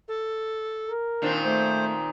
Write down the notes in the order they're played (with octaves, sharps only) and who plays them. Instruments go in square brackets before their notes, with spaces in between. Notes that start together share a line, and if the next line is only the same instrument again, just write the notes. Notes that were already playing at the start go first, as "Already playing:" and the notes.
[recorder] A4
[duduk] A#4
[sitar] A#2 D#3 C4 [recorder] D4
[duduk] A3 [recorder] C5